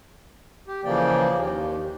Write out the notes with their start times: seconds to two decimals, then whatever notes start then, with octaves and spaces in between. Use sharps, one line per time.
0.68 G4
0.85 C#3 E3 F3 A#3 D5 G5
1.33 D#2